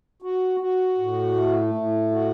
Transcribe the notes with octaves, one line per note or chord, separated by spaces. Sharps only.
F#4
F#4
A2
A3
A2
F#4